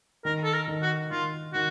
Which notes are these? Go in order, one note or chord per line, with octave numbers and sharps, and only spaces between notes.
D#3 A#4
A4
A#4
D#3
F#4
D#3 F4
D#3 F#4